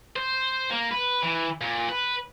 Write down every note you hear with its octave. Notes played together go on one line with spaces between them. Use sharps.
C5
A#3
B4
E3
A#2
B4